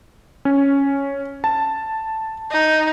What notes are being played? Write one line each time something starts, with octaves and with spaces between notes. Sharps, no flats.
C#4
A5
D#4